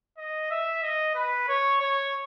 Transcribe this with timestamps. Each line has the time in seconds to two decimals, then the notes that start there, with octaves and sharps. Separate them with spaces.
0.18 D#5
0.51 E5
0.83 D#5
1.15 B4
1.48 C#5
1.80 C#5